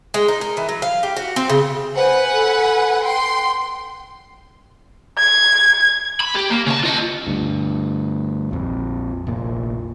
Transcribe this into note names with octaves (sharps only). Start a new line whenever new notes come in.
G#3
D#4
A#4
E3
F#3
F5
G4
F#4
C4
C#3
B4 C5 F#5 G#5
A4
G5 C6
G#6
B5
G4
A#3
C#3 A5
F4 D#5
D2 G2
A#1 F2
F1 A#1 A#2